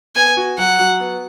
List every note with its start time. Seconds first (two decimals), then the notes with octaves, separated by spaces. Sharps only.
0.16 B3 G#5
0.37 F#4
0.58 F#3 F#5
0.79 F#3
1.00 B3